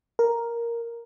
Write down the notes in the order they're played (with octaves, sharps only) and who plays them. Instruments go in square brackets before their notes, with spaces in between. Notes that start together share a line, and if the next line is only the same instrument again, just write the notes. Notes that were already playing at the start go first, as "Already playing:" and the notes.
[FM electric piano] A#4